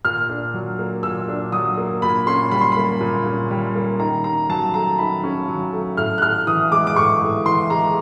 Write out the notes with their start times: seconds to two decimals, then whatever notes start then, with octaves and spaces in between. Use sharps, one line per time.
0.05 A#2 F6
0.29 D4
0.54 F#3
0.79 A#3
1.03 A#2 E6
1.28 D4
1.52 F#3 D#6
1.77 A#3
2.02 A#2 B5
2.27 C#4 C6
2.51 G3 B5
2.61 C6
2.72 A#3 B5
3.01 A#2
3.26 C#4
3.50 G3
3.75 A#3
3.99 D#3 A#5
4.24 C#4 A#5
4.49 F#3 A5
4.74 A3 A#5
4.98 D#3 B5
5.23 C#4
5.48 F#3
5.73 A3
5.97 A2 F6
6.18 F#6
6.22 A2 F6
6.47 E3 D#6
6.72 G#3 D6
6.87 D6
6.96 A2 C#6
7.21 A2
7.46 E3 C6
7.70 G#3 A#5